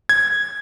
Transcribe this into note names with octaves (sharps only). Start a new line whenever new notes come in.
G#6